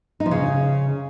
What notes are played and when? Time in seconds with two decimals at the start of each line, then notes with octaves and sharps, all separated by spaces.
0.20 D#4
0.26 F3
0.31 C#3